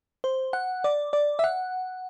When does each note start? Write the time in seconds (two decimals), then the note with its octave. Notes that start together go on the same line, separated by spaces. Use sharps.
0.24 C5
0.53 F#5
0.84 D5
1.13 D5
1.39 E5
1.44 F#5